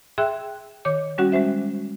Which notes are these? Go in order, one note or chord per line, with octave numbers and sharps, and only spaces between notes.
G#4 E5 G5 C6 E6 F#6
D#3 C#5 D6
G3 C#4 F#4 F#5
G#3 C#4 C5 E5